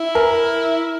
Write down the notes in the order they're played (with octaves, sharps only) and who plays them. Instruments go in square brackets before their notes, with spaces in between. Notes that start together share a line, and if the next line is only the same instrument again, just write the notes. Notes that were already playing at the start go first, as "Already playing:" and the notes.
Already playing: [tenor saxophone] E4
[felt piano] A#4